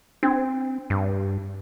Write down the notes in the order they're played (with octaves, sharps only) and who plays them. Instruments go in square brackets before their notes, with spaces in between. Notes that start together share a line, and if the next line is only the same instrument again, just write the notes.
[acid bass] C4 [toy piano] D4
[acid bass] G2